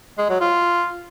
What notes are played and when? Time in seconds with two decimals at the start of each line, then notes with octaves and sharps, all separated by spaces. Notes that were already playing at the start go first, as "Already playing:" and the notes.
0.18 G#3
0.29 F#3
0.41 F4